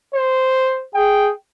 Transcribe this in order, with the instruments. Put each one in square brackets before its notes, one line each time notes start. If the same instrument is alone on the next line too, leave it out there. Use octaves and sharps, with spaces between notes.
[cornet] C5
[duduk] G#4 [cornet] G5